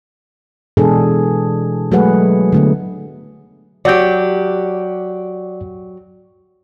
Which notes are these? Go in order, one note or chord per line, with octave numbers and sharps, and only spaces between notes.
B2 E3 G#3 D4 G#4 A4
F#3 G#3 A3 G#4 B4 F#5
D3 A3 B3
F#3 G4 D5 F#5 G6